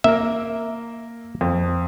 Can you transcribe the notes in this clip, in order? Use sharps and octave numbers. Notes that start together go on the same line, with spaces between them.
A#3 A#4 E5
F2